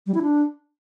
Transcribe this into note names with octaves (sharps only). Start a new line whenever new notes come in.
G3
E4
D4